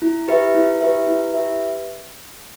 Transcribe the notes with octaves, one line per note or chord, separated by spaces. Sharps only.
E4
G4 B4 E5
E4
G4 B4 E5
E4
G4 B4 E5